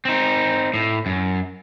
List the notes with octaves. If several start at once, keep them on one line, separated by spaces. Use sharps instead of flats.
C4 D#4
A2
F#2